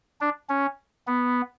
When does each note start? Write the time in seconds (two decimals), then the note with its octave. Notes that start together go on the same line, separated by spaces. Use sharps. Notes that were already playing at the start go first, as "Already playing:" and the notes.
0.21 D4
0.49 C#4
1.07 B3